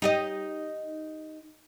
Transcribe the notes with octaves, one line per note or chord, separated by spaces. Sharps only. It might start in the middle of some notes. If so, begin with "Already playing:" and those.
D#4 G4 D#5